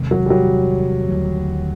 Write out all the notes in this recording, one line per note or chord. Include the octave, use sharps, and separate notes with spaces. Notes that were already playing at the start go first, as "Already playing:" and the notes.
Already playing: E2 C3 D#3 G#3
F#3
G3
F#3
D#2 D3 F#3 A3